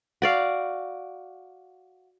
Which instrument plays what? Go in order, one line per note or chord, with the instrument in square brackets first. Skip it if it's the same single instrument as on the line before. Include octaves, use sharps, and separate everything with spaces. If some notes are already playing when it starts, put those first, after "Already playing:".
[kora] F#4 D5 F5